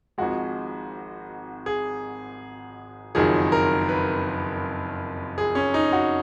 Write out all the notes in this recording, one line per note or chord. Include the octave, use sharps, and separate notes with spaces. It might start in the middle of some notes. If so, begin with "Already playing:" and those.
G#1 G#2 F3 G#3 F#4
G#4
F#1 F2 D#3 F#3 G#4
A#4
B4
G#4
C#4
D#4
F#4